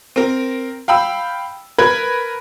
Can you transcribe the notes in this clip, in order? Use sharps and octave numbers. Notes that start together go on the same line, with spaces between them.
C4 A#4
F5 G5 B5 E6
A#4 B4 B5 G#6